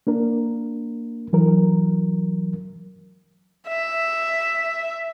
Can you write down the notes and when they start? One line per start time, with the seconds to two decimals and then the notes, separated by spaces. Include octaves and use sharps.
0.07 A#3 D4 A#4
1.33 E3 F#3 A#4
3.68 E5